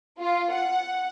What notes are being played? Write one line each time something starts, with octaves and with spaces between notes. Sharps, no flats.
F4
F#5